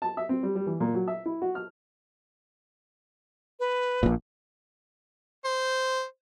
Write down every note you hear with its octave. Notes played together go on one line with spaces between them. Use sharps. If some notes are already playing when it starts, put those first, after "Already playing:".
A5
E5
C4
G3
G3
E3
A#2
F#3
E5
E4
F#4
F6
B4
A#1 A#2
C5